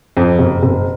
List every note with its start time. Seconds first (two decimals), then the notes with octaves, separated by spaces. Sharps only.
0.17 F2
0.39 F#1
0.63 F#1